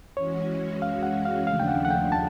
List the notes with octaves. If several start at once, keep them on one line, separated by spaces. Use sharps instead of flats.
E3 G#3 C#4 F#4 C#5
F5
F#5
F5
D#2 C#3 F3 A3 D4 F5
G5
F#5
F#5
G5
A5